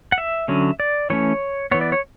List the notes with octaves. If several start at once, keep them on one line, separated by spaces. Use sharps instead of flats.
F#5
E5
D3 F#3 C#4
D5
E3 A3 C#4 C#5
E3 B3 C#5
D5
C#5